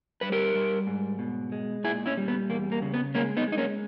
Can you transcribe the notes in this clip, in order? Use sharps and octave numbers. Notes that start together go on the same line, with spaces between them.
G3 B4
G4 A#4
G3
G#2
B2
G#3
A#2 E4 G#4
C#4 E4
G3
B3
E2 A#3
A#3
C#3
B3
G#3 A#3 C#4
B3 D#4
G#3
D#4
A#3 C#4